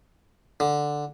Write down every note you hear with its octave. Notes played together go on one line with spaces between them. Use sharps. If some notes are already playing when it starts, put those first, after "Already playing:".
D3